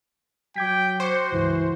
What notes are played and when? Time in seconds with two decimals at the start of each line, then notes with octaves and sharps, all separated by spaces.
0.56 F#3 G5 D6 G#6 B6
1.00 F#4 C5 C#6 D6 C#7
1.32 C#2 G2 E3